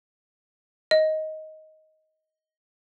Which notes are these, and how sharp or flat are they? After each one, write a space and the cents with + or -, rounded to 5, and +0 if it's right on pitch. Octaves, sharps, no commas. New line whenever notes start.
D#5 +10